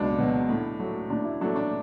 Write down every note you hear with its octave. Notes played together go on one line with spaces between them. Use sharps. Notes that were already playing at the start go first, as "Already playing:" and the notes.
Already playing: C#2 B2 F#3 D4
B2 F#3
A2
F#3 A3
A2 D4
E4
F#3 A3 D4
D4